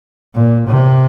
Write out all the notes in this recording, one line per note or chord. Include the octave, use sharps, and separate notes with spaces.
A#2
C3